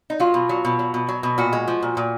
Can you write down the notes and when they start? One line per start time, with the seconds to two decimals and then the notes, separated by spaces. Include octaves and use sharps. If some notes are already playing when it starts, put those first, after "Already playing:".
0.10 D#4
0.20 F#3 F4
0.34 B2
0.49 F#3
0.65 B2
0.79 F#3
0.94 B2
1.09 F#3
1.23 B2
1.38 A#2 F#4
1.53 G#3
1.67 F3
1.83 A#2
1.97 A#2